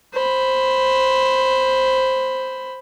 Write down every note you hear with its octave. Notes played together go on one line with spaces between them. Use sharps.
C5 B5